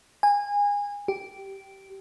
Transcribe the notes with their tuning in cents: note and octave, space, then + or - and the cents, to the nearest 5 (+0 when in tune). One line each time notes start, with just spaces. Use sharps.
G#5 -25
G4 -10